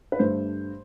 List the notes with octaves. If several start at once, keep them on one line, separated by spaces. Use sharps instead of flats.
B4
G2 D3 A3 C5